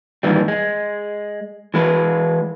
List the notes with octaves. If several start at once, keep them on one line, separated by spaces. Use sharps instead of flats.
G2 A#2 D#3 E3 G3
G#3
E3 G#3 B4